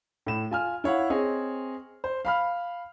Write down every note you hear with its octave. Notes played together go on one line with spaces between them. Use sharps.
A2 E7
F4 G#5 F6
E4 C#5 F5 F#5
C4 G#4 C#5 D#5
C5
F5 B5 F6